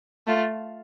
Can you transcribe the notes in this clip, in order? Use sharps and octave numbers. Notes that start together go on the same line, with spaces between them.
A3 F4